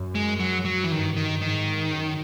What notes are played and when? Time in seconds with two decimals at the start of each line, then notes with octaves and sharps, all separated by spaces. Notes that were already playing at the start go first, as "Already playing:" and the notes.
Already playing: F#2
0.15 G#3
0.40 F#3
0.65 F#3
0.84 E3
0.91 G2 D#3
1.17 D#3
1.42 G#2 D#3
1.92 F#2